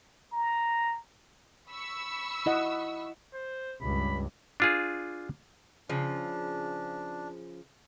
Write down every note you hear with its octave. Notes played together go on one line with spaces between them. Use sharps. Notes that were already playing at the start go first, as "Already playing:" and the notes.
A#5
B5 C#6 E6
E4 D#5 F#5
C5
C#2 G2 B5
D4 F4 G#4
C#3 F3 D4